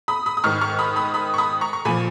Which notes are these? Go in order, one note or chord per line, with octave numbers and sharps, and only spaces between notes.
B5 D#6
B5 D#6
D#6
G#2 D#3 C#6 F6
C#6 F6
B5 D#6
B5 D#6
B5 D#6
C#6
B5 D#6
A#5 C#6
C#6
A#2 F3 G#5 B5